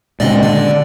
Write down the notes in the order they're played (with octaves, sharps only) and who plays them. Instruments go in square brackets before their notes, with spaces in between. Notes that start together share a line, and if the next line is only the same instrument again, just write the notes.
[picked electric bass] A#2 C#3 [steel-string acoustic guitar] G#3 F#5 G5 [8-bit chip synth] D5 D#5
[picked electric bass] D3 [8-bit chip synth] D5